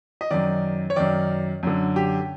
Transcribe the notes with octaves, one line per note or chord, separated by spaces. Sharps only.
D#5
F#2 D#3 D5
C#5
F#2 D#3 D5
F#2 D3
G4